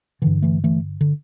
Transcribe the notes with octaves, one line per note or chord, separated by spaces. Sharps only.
G2 D3 E3
E3 A3
E3 A3
D3